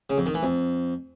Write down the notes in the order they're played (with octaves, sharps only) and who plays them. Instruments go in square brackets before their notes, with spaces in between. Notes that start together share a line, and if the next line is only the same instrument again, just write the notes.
[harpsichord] C#3
F2
D#3
E3
F2